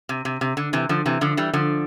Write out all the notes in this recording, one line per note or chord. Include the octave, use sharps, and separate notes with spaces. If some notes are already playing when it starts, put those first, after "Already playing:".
C3
C3
C3
D3
C3 E3
D3 F3
C3 E3
D3 F3
E3 G3
D3 F3